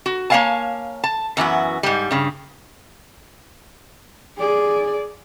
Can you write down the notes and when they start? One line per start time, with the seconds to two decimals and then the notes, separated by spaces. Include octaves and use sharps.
0.06 F#4
0.30 A#3 C#5 E5 F5 G#5 A5
1.04 A5
1.37 F#2 E3 B3 F#4
1.83 G#2 G3
2.11 G2 C#3
4.37 G#4 D5